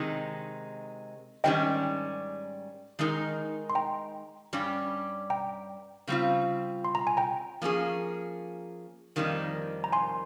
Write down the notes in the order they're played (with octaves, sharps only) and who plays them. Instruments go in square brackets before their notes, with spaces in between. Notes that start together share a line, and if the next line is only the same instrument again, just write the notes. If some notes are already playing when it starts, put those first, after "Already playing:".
Already playing: [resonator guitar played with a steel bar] C3 D#3 G#3 D#4
[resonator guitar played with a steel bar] G#2 D#3 G3 C#4 G4 [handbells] D#5 G5
[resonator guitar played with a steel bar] D#3 G#3 D#4 A#4
[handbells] C6
G5 A#5
[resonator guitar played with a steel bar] G2 G3 C#4 G4
[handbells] G5 A#5
[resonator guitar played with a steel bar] C#3 G3 C4 F4
[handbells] C6
A#5
G#5
G5 A#5
[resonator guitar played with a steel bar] F3 A#3 C#4 G#4
F2 D#3 G3 A#3 D#4
[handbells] A#5
G#5 C6